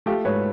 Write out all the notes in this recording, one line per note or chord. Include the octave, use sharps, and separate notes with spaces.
A3 F4 G4
G#2 B4 C#5